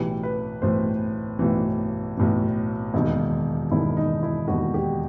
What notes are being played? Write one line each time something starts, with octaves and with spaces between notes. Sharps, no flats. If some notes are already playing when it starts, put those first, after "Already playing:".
Already playing: B1 A2 E3 G4
B4
B1 A2 E3 C5
B1 A2 E3
B1 A2 E3
E1 D#2 D#3 D#4
E1 D#2 D#3 E4
D#4
E4
E1 D#2 D#3 F#4
G4